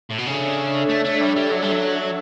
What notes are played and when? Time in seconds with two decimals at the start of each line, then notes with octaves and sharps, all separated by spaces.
0.11 A2
0.19 B2
0.27 C#3 D4 A4 C#5 E5
0.89 A3
1.05 A3
1.21 G3
1.36 G3
1.52 F#3
1.62 G3
1.72 F#3